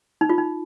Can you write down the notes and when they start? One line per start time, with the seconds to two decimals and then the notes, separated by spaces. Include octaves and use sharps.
0.21 D#4
0.30 F4
0.38 D#4